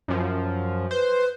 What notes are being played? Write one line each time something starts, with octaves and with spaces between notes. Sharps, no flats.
F#2 F3
B4 C5